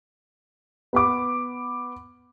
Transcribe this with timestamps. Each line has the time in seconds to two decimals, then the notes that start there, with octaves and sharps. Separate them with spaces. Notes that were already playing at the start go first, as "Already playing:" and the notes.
0.93 B3 B5 D6